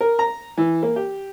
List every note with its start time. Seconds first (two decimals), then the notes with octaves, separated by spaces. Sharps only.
0.01 A#4
0.19 A#5
0.57 E3
0.83 A#3
0.96 G4